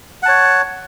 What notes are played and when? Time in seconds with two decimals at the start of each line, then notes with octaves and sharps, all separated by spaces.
0.23 F#5
0.25 A5
0.28 C#5